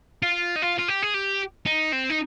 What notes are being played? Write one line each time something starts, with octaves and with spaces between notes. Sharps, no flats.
F4
D#4
F4
F4
G4
G#4
G4
D#4
C4
D#4